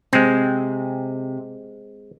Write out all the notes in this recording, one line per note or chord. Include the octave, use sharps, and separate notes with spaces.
C3 G#3 C4